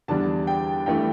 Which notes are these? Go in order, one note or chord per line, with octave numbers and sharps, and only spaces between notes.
E2 D3 G3 D4 A5
G5
G2 E3 A3 G5